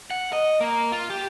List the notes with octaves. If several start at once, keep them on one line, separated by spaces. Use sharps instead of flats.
F#5
D#5
A#3
F4
G4